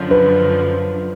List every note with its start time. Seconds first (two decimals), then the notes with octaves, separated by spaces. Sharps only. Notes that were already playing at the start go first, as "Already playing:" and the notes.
Already playing: F#2 D3 F3
0.11 B4